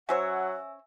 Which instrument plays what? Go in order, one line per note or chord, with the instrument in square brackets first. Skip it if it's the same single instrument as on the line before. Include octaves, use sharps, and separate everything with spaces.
[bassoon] F#3 [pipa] C#4 C5 C#5 [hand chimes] E5 G#5 E6 [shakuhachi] F#5